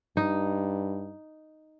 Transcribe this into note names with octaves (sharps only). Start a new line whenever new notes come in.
G2 D#4